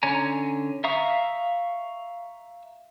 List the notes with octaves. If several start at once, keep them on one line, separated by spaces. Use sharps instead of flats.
D3 C#4 G#5 A#5
E5 F5 A#5 C#6 D#6